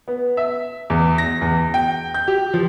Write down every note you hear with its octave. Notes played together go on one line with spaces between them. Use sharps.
B3
E5
E2
A#6
E2
G5
G6
G4
F3